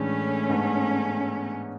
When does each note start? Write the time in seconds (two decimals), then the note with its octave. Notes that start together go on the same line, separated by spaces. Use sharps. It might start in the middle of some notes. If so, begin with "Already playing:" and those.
Already playing: A2 E3 G#3 A3 C#4 D4
0.50 G#2 G#3 B3 D4